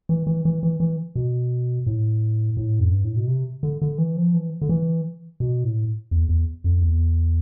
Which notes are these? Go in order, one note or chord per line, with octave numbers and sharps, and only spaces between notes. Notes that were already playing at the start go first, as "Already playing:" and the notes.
E3
E3
E3
E3
E3
B2
A2
A2
F2
G2
A2
B2
C3
D3
D3
E3
F3
E3
D3
E3
B2
A2
E2
E2
F2
E2